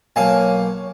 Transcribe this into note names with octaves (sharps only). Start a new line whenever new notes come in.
B1 A#3 C#5 F5 G#5 A5